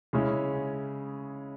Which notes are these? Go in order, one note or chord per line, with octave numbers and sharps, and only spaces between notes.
C#3 G#3 C#4 E4